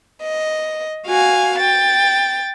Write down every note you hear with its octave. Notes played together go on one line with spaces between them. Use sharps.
D#5
F#4 F5 G#5
G5 A6